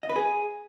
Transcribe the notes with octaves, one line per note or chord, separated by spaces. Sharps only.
D#5
B4
G#4